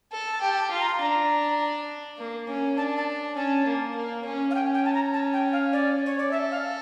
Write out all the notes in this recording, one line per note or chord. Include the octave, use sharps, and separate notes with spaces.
A4
A5
G4 G5
G5
A5
F4
A#5
D4 A#5
A#3
C#4
D4 A5
A5
C#4 A5
A#3
A#3
C#4
F5
C#4 G5
G5
A5
A#5
A5
G5
F5
D5
C#5
D5
A4 E5
F5